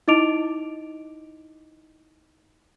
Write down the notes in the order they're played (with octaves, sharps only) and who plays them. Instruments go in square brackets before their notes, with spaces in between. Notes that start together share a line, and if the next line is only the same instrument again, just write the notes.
[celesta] D#4 E4 D#5 D6 D7 F7